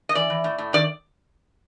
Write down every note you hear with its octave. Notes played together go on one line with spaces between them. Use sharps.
D#5
E3 D5
E3
A2
A2
D#3 D5